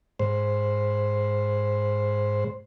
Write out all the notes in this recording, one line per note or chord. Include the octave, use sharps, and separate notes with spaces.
G#2 C5